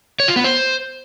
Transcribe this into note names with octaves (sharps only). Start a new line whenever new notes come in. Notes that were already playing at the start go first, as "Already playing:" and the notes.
C#5
F4
B3
C5